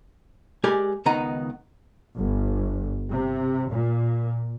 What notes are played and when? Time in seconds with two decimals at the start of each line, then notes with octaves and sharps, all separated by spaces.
0.64 G#3 G4 A#4 D5 G#5
1.06 C#2 D#3 B3 D#4 A#5
2.17 G1
3.11 C3
3.69 A#2